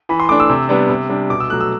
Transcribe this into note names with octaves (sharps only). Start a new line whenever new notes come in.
E3 B5
C6
A3 D4 D6
E6
C3
G3 B3 D4
C3
G3 D4
B2 D6
E6
F#3 A3 F#6
E6